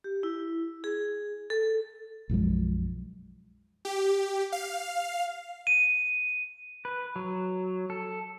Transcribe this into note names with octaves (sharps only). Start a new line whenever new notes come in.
G4
E4
G#4
A4
B1 F#2 F3 G#3
G4
F5
D#7
B4
F#3
A4